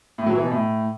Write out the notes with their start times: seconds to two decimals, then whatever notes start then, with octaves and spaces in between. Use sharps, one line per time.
0.18 A2
0.26 F#3
0.35 E3
0.43 B2
0.51 A2